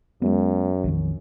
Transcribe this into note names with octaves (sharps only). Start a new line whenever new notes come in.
F#2 G#3 B3
A#1 F2 D#3